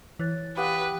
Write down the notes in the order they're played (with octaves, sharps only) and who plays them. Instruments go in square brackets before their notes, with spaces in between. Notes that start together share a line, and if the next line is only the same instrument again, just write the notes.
[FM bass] E3 [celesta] C#5 F#6 A6
[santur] G4 F#5 [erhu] B4 [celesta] F5 D#6 F#6